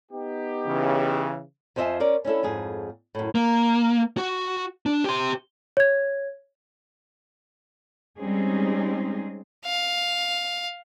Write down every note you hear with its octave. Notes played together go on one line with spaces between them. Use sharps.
B3 D#4 G4
C#3 E3
F2 F3 C5 D#5 E5 G#5
C#4 A#4 D5
C#4 D4 E4 A4
F2 G#2 G#4
F#2 A2
A#3
F#4
D4
G4 C6
C#5 G#6
G3 G#3 C4 C#4 D#4 G#4
F5